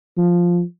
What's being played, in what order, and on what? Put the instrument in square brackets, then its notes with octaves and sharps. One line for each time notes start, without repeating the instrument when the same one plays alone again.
[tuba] F3